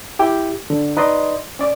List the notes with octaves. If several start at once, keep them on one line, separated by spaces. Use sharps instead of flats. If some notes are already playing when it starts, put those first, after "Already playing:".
E4 G4 G5
D3
D#4 B4 D5 D#5 C6
C#4 D5 D6